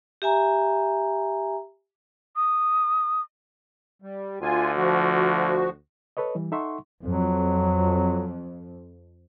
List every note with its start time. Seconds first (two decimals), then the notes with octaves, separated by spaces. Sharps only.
0.22 G4 E5 G#5 A#5
2.36 D#6
4.02 G3
4.42 D2 F4 G#5
4.76 F3 F#4
6.17 A4 B4 C#5 D#5
6.35 E3 G3
6.52 D#4 A4 E5 F#5 C6 C#6
7.05 F2 F#3